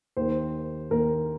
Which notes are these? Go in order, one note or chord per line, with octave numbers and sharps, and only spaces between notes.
D#2 D#3 A#3 C5
D#2 D#3 A#3 A#4